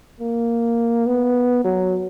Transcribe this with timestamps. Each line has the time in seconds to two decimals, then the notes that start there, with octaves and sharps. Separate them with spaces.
0.21 A#3
1.06 B3
1.64 F#3